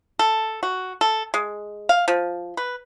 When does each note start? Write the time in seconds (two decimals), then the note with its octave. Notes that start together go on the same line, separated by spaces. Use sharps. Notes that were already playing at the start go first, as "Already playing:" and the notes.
0.19 A4
0.63 F#4
1.01 A4
1.34 G#3
1.89 F5
2.08 F3
2.57 B4